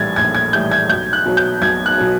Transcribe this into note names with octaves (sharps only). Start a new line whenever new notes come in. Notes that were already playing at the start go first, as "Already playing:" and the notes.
Already playing: A#1 A2 E3 G3 G#6 A6
A#1 G#6
G#6
A2 E3 G3 G6
G#6
B1 G6
F#6
B2 F#3
G6
B1 G#6
F#6
B2 F#3